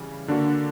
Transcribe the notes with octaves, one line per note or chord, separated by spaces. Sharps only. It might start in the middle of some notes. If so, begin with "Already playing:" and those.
Already playing: C#3 E3 G3
D3 A#3 D4 F#4